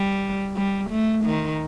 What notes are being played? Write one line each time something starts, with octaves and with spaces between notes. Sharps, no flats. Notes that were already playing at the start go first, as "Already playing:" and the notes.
Already playing: G3
G3
A3
D#3